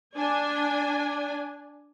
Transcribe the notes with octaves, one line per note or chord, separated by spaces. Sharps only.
D4 G#5